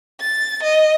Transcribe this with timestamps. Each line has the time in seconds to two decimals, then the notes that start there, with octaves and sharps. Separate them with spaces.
0.20 A6
0.63 D#5